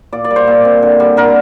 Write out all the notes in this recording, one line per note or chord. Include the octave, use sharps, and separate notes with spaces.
A#2 D5
D5
G3
C5
A#2
C4
D3
G3
D3 A#4